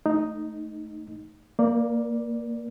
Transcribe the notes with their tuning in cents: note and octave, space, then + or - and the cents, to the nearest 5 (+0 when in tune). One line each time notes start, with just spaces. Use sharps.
A3 +0 D#4 +0
A#3 -5 A#4 +45 D5 +0